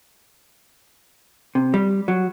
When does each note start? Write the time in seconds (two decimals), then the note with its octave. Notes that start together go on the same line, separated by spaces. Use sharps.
1.55 C3
1.74 G3
2.08 F#3